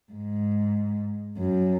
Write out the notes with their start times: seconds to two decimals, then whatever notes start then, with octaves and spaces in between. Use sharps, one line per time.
0.12 G#2
1.38 F#2